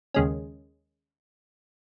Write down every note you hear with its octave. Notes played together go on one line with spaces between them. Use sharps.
D#2 C#3 G#3 C#4